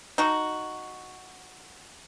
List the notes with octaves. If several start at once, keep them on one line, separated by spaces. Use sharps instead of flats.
D#4 F#4